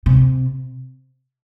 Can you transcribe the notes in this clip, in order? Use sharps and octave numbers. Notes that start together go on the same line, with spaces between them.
C3